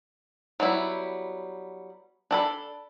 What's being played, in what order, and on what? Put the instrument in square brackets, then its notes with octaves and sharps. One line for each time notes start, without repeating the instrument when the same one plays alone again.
[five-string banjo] F#3 G3 B3 E4
D4 A4 B5